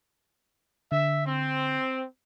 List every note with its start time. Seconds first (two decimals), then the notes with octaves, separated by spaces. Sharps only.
0.92 D3 E5
1.26 C4